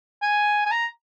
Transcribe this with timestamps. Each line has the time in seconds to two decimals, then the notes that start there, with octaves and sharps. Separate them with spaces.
0.22 G#5
0.66 G#5
0.71 A#5